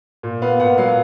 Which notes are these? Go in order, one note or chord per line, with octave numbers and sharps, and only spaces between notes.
A#2
B3 F5
A#2 F#5
F#3 F5